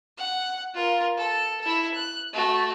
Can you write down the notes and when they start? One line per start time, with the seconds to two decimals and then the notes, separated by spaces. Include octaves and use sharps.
0.18 F#5
0.74 F4 A#4
1.17 A4
1.61 E4 A4
1.94 F#6
2.33 A3 F#4